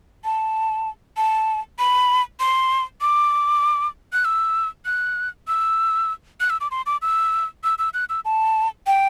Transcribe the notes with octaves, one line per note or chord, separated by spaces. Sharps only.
A5
A5
B5
C6
D6
F#6
E6
F#6
E6
F#6
E6
D6
C6
D6
E6
E6
E6
F#6
E6
A5
G5